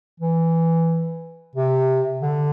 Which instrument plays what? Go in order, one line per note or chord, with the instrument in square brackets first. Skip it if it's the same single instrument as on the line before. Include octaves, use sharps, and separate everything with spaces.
[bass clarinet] E3
C3
D3